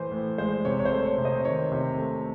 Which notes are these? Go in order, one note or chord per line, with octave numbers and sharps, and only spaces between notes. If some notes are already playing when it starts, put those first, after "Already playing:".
Already playing: A2 E3 C5
A2
G#3 C5
C3 C#5
C#5
C5
A3
C#5
C3
C5 D#5
D#3 C#5
C3
A3